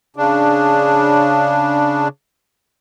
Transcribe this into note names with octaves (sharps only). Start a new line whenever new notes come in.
C#3 D4